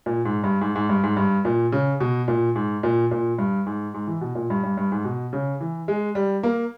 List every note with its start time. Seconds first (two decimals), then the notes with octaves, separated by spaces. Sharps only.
0.06 A#2
0.25 G#2
0.44 G2
0.61 G#2
0.75 G#2
0.89 G2
1.03 G#2
1.17 G2
1.45 A#2
1.72 C#3
2.00 B2
2.28 A#2
2.55 G#2
2.83 A#2
3.11 A#2
3.38 G2
3.66 G#2
3.94 G#2
4.07 E3
4.21 B2
4.35 A#2
4.50 G2
4.63 G2
4.77 G2
4.92 G#2
5.05 B2
5.33 C#3
5.60 E3
5.88 G#3
6.15 G3
6.43 A#3